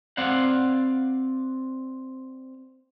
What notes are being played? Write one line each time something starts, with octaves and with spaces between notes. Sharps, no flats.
C4 D5 F5 F#5